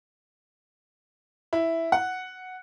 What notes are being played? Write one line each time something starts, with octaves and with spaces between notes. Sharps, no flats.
E4
F#5